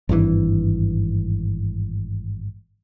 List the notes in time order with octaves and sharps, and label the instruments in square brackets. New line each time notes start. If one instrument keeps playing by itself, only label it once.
[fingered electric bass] G#1 G2 D#3 E3